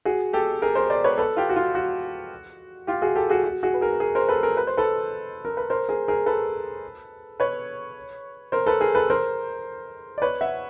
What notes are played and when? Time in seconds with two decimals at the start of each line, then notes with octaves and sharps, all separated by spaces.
0.05 F#4 G#4
0.33 G4 A4
0.62 G#4 A#4
0.75 A#4 C5
0.90 C5 D5
1.04 B4 C#5
1.18 A4 B4
1.37 F4 G4
1.49 F#4
1.56 F4
1.75 F#4
2.87 F4 G4
3.02 F#4 G#4
3.15 G4 A4
3.30 F#4 G#4
3.44 F#4
3.63 F#4 G#4
3.74 B4
3.81 G#4 A#4
4.00 G#4 A#4
4.15 A#4 C5
4.29 A4 B4
4.43 G#4 A#4
4.57 B4
4.67 C5
4.77 A4 B4
5.45 A#4
5.57 B4
5.70 A#4 C5
5.89 G#4 A#4
6.08 G#4 A#4
6.26 A4 B4
7.40 B4 C#5
8.52 A#4 C5
8.66 A4 B4
8.81 G#4 A#4
8.95 A4 B4
9.10 A#4 C5
10.18 D5
10.22 B4 C#5
10.41 E5 F#5